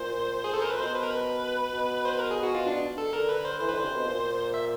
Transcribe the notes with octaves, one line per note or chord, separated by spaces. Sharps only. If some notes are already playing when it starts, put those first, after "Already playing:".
Already playing: A#2 C5
G#4
A4
A#4
A#2 B4
B2 C5
B4
A#4
B4
B2
C5
B4
A#4
G#4
F#4
F4
D4
A4
D3 A#4
B4
C5
E3 C5
D3 B4
C5
C3
B2
A#2
E5